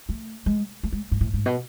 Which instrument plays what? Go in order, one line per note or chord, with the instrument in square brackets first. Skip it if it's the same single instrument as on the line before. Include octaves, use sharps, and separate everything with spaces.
[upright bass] A3
G#3
A3
G#3
G#2
A2
G#2
B2